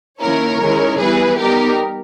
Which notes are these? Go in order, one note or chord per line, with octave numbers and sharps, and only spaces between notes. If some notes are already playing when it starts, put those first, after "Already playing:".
D#3 A#3 C#4 E4 A#4 C#5
D#3 G#3 C#4 E4
E3 G3 B3 E4 G#4 B4
G3 B3 D#4 G4 A#4